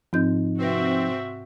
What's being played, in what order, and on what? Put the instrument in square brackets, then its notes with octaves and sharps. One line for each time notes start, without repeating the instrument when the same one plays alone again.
[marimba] G#2 C4 G6 [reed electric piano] F3 D#4
[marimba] C3 B4 A#6 [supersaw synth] C4 [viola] F#4 E5